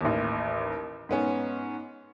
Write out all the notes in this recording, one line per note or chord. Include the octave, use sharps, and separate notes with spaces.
A1 D#2
G#2 B3 C#4